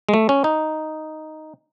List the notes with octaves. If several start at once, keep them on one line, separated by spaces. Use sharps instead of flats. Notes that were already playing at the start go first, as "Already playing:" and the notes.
G#3
A3
C#4
D#4